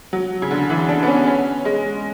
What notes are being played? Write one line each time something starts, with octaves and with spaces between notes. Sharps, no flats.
F#3
C#3
D3
E3
D4
B3
C#4
C#4
G#3